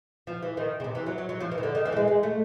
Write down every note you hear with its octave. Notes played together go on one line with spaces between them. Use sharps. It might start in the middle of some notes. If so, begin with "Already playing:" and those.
F3
E3
D#3
C#3
C3
E3
F#3
F#3
F#3
F3
E3
D#3
D3
D#3
E3
A3
G#3
G#3
A3